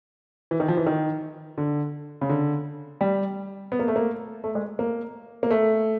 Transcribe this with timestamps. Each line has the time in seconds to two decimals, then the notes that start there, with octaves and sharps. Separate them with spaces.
0.51 E3
0.60 D#3
0.68 F3
0.77 E3
0.86 D#3
1.58 D3
2.21 C#3
2.29 D3
3.01 G3
3.72 B3
3.79 A#3
3.88 A3
3.96 A#3
4.44 A3
4.55 G#3
4.79 A#3
5.43 A#3
5.51 A3